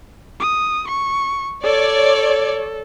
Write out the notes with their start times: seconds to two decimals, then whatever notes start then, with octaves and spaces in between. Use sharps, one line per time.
0.40 D#6
0.88 C#6
1.64 A4 C#5 D5